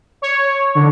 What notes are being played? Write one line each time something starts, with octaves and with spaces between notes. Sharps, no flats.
C#5
D3